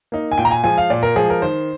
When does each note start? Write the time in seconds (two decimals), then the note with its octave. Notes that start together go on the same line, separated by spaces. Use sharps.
0.12 A#3 D#4
0.32 G#5
0.38 A#2 G5
0.45 A#5
0.51 G#5
0.64 F3 G#3 G#5
0.78 F5
0.90 A#2 D5
1.03 A#4
1.16 F3 G#3 G#4
1.30 A#4
1.42 D#3 C5